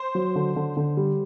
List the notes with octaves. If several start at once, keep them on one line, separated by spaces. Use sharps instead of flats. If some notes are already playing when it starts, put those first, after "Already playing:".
Already playing: C5
F#3
D3
D3
D3
G3